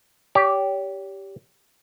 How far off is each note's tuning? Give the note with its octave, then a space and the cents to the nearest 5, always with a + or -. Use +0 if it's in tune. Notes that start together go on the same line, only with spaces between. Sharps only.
G4 +0 C#5 +40